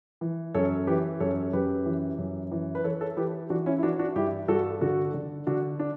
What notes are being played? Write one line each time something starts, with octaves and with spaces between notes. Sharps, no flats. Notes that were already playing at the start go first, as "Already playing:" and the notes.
E3
F#2 A4 C#5
E3 G4 B4
F#2 A4 C#5
F#2 G4 B4
E3
F#2
E3
B4
E3 A4 C#5
A4 C#5
E3 G4 B4
E3 D4 F#4
C#4 E4
E4
E3 D4 F#4
D4 F#4
G2 E4 G4
G2 F#4 A4
D3 F#4 A4
D3
D3 D4 F#4
D4